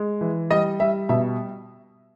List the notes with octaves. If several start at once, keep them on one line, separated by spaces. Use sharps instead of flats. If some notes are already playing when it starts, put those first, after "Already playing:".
Already playing: G#3
E3
G3 D#5
G3 E5
B2 E5